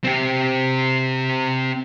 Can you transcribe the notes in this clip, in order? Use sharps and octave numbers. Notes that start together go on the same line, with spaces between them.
C4 G4